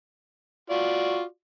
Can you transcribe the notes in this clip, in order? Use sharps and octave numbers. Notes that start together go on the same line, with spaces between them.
F4 F#4 D5